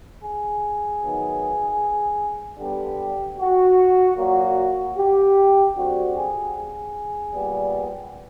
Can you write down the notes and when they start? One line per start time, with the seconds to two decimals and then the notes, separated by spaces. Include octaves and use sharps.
0.22 G#4
1.01 D#3 F#3 B3
2.59 D3 G3 B3 G4
3.38 F#4
4.17 A#2 F#3 A#3 F#4
4.97 G4
5.75 D3 G3 C4 F#4
6.15 G#4
6.55 G#4
7.34 A#2 G3 B3